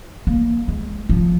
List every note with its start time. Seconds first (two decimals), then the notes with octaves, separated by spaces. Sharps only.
0.27 A#3
0.68 G#3
1.09 F3